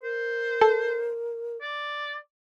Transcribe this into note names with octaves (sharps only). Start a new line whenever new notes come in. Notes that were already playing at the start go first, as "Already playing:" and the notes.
A#4 C5
A4
D5